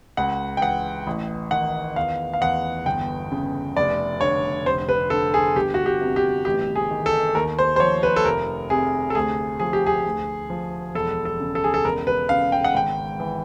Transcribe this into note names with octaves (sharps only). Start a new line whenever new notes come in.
C#2 F#5
G5
E3 F#5
A1
D#3 F#5
E2 F5
F5
E2 F#5
G1 G5
C#3
F1 D5
D3 C#5
F1 C5
B4
D3 A4
G#4
G1 G4
F#4
G4
C3
G4
A1 G4
G#4
D#3
A4
D#2 A#4
C5
C5
F3 C#5
B4
A4
F1 A#4
C3 G#4
A4
D2 G#4
F3 G#4
G4
G#4
D2
F3
E1 A4
A4
C#3
A4
G#4
A4
E1 A#4
B4
C#3 F5
G5
F#5
G#1 G5
E3